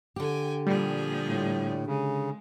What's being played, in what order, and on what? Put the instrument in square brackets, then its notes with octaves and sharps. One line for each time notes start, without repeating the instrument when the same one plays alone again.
[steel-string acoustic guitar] D3 G4 [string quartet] G5 G#5
[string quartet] A#2 F3 G#4 [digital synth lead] G3
[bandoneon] A2
[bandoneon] C#3 [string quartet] G#3